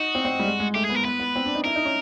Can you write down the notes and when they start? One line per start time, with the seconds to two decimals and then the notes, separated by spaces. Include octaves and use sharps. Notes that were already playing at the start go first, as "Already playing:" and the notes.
Already playing: D#4 F#4
0.15 C4
0.25 C4
0.39 G3
0.46 G#3
0.60 G#3
0.74 A3 G4
0.85 B3 G#4
0.95 A#4
1.05 B3 B4
1.20 B3
1.36 C4
1.45 D4
1.55 D#4
1.64 E4 A#4
1.76 D#4
1.85 C#4